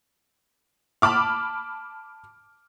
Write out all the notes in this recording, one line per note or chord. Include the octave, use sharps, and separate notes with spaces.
A5 B5 D6 F6